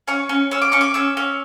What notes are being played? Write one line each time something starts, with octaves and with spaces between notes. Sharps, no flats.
C#4 C#6
C#4
C#4 E6
D6
C#4 C#6
D6
C#4 E6
C#4